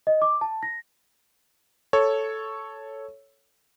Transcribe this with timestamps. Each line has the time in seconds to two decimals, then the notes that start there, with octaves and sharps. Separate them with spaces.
0.07 D#5
0.22 D6
0.41 A5
0.63 A#6
1.93 A4 C#5